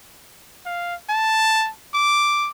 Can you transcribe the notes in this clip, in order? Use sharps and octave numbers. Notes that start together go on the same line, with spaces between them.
F5
A5
D6